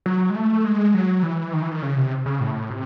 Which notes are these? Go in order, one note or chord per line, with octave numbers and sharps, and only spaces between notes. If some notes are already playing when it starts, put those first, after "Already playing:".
F#3
G#3
A3
G#3
F#3
E3
D#3
E3
D#3
C#3
C3
C#3
A2
C3